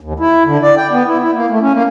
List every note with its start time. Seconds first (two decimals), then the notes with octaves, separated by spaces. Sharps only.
0.01 D#2
0.20 E4
0.46 D3
0.63 D5
0.77 G5
0.92 B3
1.08 E4
1.21 E4
1.35 A#3
1.50 A3
1.61 C#4
1.74 A#3